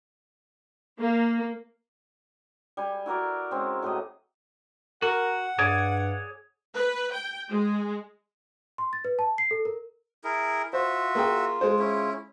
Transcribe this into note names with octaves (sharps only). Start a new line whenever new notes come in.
A#3
G3 G#5
E4 F#4 A#4 D5
G#3 C4 C#4
A2 F#3 G4 D#5
F#4 A#4 F#5
G2 G#4 C#5 D5
B4
G5
G#3
C6
A6
B4
A5
C7
A4
A#4
E4 G#4 A#4
F4 F#4 C5 E5
A#3 G#4 G5
G#3 C5
C#4 E4